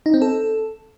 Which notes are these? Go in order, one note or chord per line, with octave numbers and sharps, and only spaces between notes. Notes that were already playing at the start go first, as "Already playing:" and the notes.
D#4
C4
A4